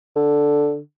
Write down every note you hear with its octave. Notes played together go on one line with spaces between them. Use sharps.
D3